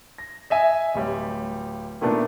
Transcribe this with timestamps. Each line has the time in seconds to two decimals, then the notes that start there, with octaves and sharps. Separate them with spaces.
0.18 A#6
0.50 D#5 E5 G#5
0.94 D1 G3 C#5
2.01 A#2 D#3 A3 B3 D4